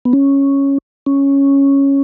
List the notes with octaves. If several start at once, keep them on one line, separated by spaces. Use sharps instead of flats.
B3
C#4
C#4